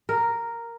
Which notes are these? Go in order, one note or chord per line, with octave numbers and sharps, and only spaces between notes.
A#4